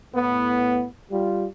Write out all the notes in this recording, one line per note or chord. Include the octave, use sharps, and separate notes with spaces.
A2 B3
G3 F4